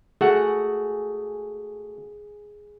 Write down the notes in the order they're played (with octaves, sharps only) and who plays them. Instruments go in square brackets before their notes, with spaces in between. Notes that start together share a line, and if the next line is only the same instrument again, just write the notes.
[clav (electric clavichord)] A3 F#4 F#5 [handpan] G#4